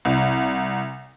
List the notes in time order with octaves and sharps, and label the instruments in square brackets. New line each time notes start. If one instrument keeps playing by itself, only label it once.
[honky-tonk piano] C2